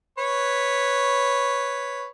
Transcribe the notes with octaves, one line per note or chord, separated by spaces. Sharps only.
B4 C#5